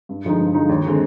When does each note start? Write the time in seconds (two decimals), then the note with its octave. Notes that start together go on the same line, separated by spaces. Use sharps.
0.09 G2
0.25 D3 F3 G#3 D#4
0.40 G2
0.54 D3 F3 G#3 D#4
0.69 D#2
0.85 D3 G#3 C4